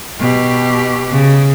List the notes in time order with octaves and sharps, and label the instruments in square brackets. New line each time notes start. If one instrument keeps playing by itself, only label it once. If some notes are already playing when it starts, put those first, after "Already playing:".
[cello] B2 G4
[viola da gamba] C#3